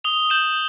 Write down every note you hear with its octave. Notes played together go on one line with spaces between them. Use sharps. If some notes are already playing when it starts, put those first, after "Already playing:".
D#6 F7 G7
G6 E7 F#7